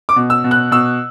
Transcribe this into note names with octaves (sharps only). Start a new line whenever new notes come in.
D6
B2
E6
B2
F#6
B2 E6